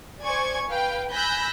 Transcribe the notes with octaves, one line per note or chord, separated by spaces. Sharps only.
C5 D5 G#5 C#6 G#6
B4 F5 G5
G#5 B5 E6 F#6 G6 A#6